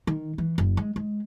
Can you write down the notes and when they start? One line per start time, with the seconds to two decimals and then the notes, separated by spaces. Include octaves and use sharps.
0.07 D#3
0.38 E3
0.58 F#1
0.77 G#3
0.96 G#3